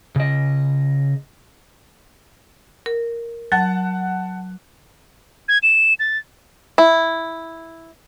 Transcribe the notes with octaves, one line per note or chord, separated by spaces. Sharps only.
C#3 D#5
A#4
F#3 F#5 A5 F#6
G#6
E7
A6
E4